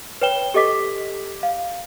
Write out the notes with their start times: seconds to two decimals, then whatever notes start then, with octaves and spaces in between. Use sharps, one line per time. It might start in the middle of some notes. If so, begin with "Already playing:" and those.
0.21 B4 C#5 G5 E7 G7
0.54 G4 A4 D#5 D6 B6
1.43 F5